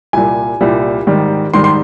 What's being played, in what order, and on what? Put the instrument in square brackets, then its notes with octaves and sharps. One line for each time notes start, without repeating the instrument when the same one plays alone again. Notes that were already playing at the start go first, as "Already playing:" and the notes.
[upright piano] C2 A#2 G3 G#5
C2 A#2 G3
G#2 D#3 G3
G#2 D#3 G3 C6
C6